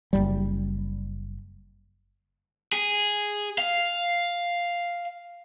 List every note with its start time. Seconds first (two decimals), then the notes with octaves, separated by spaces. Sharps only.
0.13 F#1 B1 G3
2.73 G#4
3.58 F5